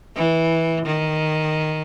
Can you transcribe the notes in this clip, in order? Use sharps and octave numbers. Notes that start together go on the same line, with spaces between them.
E3
D#3